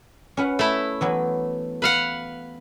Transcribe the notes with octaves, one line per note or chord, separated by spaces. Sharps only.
C#4 B4 F#5
A3 E4
E3 F#3 B3
B4 F5 F#5